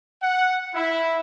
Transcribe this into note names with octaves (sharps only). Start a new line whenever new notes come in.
F#5
E4